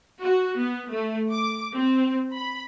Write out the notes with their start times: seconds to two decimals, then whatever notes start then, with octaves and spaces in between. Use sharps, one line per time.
0.21 F#4
0.59 B3
0.92 A3
1.30 D6
1.74 C4
2.34 B5